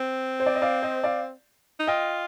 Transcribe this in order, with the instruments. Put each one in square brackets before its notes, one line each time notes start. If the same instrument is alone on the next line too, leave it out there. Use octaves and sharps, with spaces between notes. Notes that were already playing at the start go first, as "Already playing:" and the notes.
Already playing: [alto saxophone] C4
[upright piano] C5
D5
D#5
D5 F5
C5 D#5
D5 F5
[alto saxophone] D#4
[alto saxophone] F4 [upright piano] D#5 G5